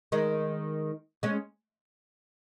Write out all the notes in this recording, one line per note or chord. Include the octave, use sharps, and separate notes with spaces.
D#3 G#3
G#3 C#4